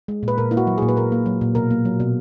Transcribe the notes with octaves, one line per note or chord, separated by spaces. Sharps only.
G#3
A#2
B4
A#2 A#4
A#3 E4
F#4
F#3
G#4
A#2
B4
A#2 A#4
A#3
F#3
A#2
B2 A#4
A#3
F#3
B2